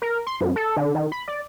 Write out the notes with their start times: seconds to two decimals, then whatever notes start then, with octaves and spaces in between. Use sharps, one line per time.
0.02 A#4
0.27 C6
0.41 F#2
0.56 A4
0.77 D3
0.95 D#3
1.12 B5
1.28 D5